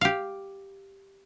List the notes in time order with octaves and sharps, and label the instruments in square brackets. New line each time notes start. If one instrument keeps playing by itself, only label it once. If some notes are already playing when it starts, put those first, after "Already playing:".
[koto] G4 F5